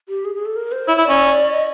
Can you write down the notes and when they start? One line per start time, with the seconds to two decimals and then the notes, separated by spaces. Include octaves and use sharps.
0.09 G4
0.25 G#4
0.35 G#4
0.46 A4
0.56 A#4
0.72 C5
0.88 E4 C#5
0.98 E4
1.03 D5
1.09 C#4
1.52 D#5